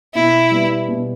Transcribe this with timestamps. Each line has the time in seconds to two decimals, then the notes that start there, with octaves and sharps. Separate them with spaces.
0.14 B2 E4
0.51 G3 B3
0.88 B2